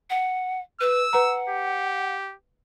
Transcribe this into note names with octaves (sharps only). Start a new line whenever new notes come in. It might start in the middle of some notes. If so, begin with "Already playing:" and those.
F#5
B4 E6
B4 F#5 A#5
G4